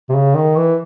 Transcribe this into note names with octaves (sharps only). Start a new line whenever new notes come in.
C3
C#3
D#3
E3